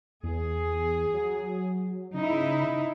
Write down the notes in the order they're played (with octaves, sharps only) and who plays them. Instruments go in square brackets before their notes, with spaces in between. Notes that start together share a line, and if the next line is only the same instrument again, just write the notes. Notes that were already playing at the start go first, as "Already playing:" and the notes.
[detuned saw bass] E2 [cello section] G#4
[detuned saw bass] F#3
[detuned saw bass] C#3 [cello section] D#4 E4